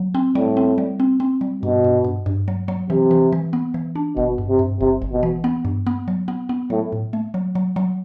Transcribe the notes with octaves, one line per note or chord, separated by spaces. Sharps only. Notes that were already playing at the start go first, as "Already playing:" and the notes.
Already playing: F#3
C4
A2 G3
C4
G3
C4
C4
G3
G2 B2
G2
G2
G2
F#3
F#3
C3 E3
E3
E3
B3
E3
D4
G1 B2
G2
C3
G2
G1 C3
G1
B2
E3
B3
G2
B3
F#3
B3
B3
A2 F#3
A2
A3
F#3
F#3
F#3